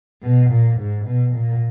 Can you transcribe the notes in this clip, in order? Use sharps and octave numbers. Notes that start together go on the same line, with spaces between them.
B2
A#2
G#2
B2
A#2